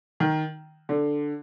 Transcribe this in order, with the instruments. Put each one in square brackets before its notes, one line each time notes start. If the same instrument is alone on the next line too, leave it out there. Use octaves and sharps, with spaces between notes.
[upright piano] D#3
D3